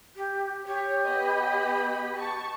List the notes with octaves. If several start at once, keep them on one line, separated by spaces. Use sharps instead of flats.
G4
G4 C#5
B3 D#5 B5
A5 C#6